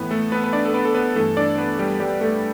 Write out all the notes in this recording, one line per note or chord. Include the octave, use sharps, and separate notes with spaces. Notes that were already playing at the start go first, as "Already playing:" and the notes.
Already playing: A2 E3 B3 B4
A3 A4
B3 B4
B4
D4 D5
A4
B3 B4
A4
B3 B4
G2 E3 A3 A4
D4 D5
B3 B4
G3 G4
G3 G4
A3 A4